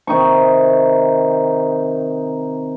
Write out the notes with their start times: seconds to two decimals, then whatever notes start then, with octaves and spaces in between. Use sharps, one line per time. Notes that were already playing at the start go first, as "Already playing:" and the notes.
0.07 C3 D#3 D#4 C#6